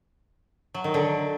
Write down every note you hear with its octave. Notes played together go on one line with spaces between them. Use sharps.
F#3
D#3
D3